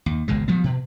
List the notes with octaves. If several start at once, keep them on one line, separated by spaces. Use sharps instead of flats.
D#2
G#1 C#2 B2 G#3
F3 G3 B3
B2